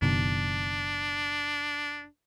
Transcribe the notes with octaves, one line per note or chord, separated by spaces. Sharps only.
F#1 B2 D#3 D4